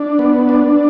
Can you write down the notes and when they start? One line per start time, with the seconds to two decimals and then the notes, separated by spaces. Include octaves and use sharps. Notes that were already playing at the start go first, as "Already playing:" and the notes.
Already playing: D4
0.19 B3
0.49 D4